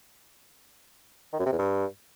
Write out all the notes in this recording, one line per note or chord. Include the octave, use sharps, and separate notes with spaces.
D#3
F#2
C3
E2
G2